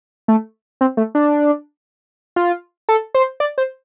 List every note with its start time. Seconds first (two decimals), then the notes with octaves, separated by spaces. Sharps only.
0.28 A3
0.81 C4
0.97 A3
1.15 D4
2.36 F4
2.89 A4
3.14 C5
3.40 D5
3.58 C5